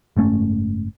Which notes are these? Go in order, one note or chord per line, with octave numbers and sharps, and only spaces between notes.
F#1 G#2 A3 C#4